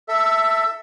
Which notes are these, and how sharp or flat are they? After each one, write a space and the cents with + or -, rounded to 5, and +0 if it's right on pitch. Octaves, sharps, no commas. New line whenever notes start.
A4 +20 E5 +0